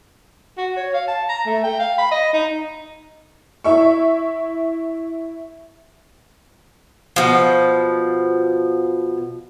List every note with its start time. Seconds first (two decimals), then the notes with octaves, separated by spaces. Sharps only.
0.58 F#4
0.77 C#5
0.94 F5
1.08 A5
1.29 A#5
1.46 A3
1.64 G5
1.79 F5
1.98 B5
2.11 D#5
2.33 D#4
3.64 E4 E5 C#6
7.16 B2 F3